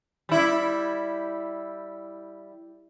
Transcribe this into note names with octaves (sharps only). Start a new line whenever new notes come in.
G3 E4